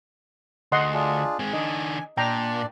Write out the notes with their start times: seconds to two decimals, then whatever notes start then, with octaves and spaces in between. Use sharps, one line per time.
0.72 D2 D#5 F#5 C6
0.93 D4 F4 G#4
1.39 G#3 C4 G#5
1.53 D#3 D4 D#5
2.17 A#2 D4 D5 G5 A#5